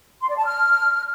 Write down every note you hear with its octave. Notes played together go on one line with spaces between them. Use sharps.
C6
D5
A5
F6